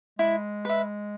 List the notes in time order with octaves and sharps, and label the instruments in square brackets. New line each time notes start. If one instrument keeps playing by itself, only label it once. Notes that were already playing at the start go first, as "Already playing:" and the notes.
[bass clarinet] G#3 [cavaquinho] E4
[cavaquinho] B4 E5